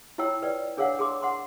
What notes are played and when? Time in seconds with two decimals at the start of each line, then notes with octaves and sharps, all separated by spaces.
0.18 E4 F4 C#5 G5 E6
0.42 B4 D5 G5
0.77 D4 G#4 A#4 C#5 F5 F#5
0.99 G#4 A#4 C6 D6
1.23 F#5 C6